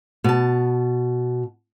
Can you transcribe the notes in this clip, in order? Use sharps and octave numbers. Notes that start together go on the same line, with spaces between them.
B2 A5